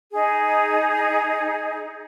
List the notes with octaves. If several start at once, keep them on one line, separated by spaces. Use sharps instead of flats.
D#4 G#4